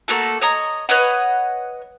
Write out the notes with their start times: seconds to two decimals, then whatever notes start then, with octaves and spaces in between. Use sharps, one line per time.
0.08 A3 A#3 F#4 A4
0.41 C#5 D#5 A#5
0.89 B4 C#5 D#5 F#5